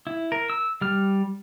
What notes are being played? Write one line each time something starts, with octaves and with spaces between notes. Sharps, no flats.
E4
A#4
E6
G3 F6